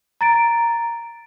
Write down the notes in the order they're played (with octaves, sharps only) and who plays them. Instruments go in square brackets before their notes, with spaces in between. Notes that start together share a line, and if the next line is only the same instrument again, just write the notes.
[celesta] A#5 A6 D7